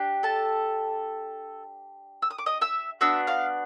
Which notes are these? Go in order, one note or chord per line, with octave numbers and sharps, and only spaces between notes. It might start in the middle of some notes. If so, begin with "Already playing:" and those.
Already playing: D4 G4
A4 A5
E6
D#6
D6
D#5 D#6
E5 E6
B3 D4 F#4 E5 E6
F5 F6